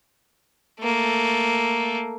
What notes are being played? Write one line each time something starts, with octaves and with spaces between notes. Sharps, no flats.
A3 A#3